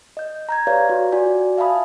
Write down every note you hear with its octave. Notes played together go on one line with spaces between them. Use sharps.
D#5 G6
A#5 G6 G#6
G4 B4 C#5 D5 F5
F#4
F4 F#4 D5 G#5
E5 F5 G#5 A5 B5 D#6